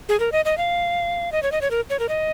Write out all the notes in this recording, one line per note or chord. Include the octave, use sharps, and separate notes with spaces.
G#4
A#4
D#5
D#5
F5
D#5
C#5
D#5
C#5
A#4
C#5
A#4
D#5